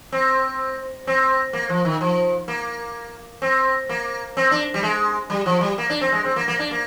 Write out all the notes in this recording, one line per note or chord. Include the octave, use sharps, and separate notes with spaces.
C4
C4
A#3
F3
D#3
F3
A#3
C4
A#3
C4
D4
G3
G#3
G3
F3
G3
A#3
D4
C4
G#3
C4
A#3
A#3
D4
A#3